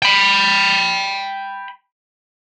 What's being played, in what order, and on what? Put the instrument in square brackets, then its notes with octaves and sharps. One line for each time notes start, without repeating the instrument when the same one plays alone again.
[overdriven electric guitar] G5 B5